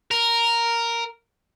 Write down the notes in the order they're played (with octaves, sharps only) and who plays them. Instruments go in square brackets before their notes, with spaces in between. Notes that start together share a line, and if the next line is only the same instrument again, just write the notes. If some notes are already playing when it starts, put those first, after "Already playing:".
[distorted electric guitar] A#4